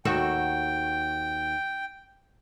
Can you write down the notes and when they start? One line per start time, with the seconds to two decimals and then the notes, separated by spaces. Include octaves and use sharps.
0.05 D#2 F#4 A4 G5